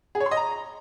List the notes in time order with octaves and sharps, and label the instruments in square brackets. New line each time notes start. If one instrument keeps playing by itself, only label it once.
[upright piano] G#4
C#5
C6
D#5
A#5